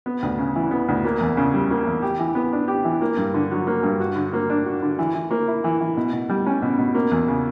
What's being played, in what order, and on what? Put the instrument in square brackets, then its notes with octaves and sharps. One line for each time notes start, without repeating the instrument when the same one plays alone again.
[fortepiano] B3
D2
C#3
E3
B3
D2
A#3
E2
C#3
G3
A#3
E2
G4
E3
B3
D4
G4
E3
A#3
G2
D3
F#3
A#3
G2
F#4
D3
A#3
D4
F#4
D3
E3
E3
A#3
E4
E3
E3
B2
B2
G3
C#4
B2
B2
A#3
E2
C#3